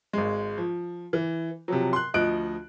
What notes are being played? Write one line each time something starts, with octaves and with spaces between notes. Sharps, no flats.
G#1 G#3
F3
E3
C3 F3 F#3
C6 F#6
D2 F3 D#5 F#6 D7